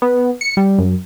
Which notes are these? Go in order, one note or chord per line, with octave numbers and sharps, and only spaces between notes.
B3
C#7
G3
F#2